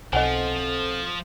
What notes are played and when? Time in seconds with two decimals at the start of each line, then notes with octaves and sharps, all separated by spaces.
0.13 B1 F3 C4 A4 D#5 F#5 G#5